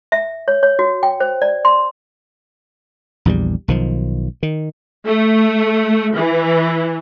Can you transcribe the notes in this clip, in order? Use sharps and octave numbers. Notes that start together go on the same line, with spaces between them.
E5
C#5
C#5
F#4
G5
C5
D5
C6
A#1 E2 D3 G3
B1 D#3 F3
D#3
A3
E3